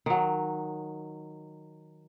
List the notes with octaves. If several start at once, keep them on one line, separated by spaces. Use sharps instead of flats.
D#3 F#3